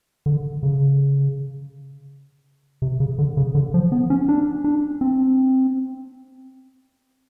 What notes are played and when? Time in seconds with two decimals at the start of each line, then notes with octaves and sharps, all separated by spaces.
0.26 D3
0.63 C#3
2.82 C3
3.00 C#3
3.18 D3
3.37 C#3
3.55 D3
3.74 F3
3.92 B3
4.10 C#4
4.29 D4
4.64 D4
5.01 C4